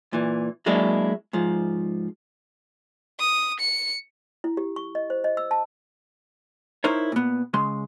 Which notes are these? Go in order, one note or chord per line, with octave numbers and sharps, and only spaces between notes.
A#2 E3
F#3 G#3 A#3 D4 E4
G#2 F3
D#6
C#7
E4
G4
C#6
D#5
C5
D#5
E6
A5
D#4 E4 A#4 C5 C#5
A#2 B3
C#3 G#3 C6